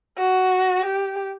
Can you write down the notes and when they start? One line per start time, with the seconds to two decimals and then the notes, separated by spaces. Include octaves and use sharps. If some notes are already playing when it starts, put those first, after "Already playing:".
0.18 F#4
0.85 G4